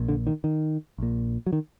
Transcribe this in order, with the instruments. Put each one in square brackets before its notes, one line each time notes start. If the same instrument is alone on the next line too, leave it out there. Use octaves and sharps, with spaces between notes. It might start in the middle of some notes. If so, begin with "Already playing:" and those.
Already playing: [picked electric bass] A#1 A#2
D3
D#3
D#3
A#1 A#2
F#3
D#3